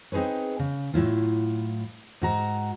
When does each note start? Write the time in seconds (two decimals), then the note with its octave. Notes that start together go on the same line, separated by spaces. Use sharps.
0.12 C4 D#4 G#4 B4 C#5
0.59 C#3
0.94 A2 F#3 E4 F4
2.22 G#2 F#4 A#5